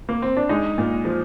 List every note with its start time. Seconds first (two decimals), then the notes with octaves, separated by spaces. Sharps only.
0.09 A#3
0.22 C4
0.37 D4
0.49 G#3 D#4
0.78 A#2
1.05 F3